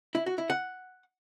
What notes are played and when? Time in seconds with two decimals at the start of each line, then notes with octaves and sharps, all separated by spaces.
0.15 E4
0.26 F#4
0.38 E4
0.50 F#5